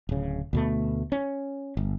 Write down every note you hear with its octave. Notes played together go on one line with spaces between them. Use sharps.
D1 C#3
D2 B2 A3
C#4
G1